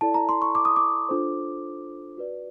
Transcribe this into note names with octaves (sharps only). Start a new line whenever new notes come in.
E4 A4 D5 A5
A#5
C6
C#6
D6
D#6
D6
D4 F4 A4 C5
F#4 B4 D5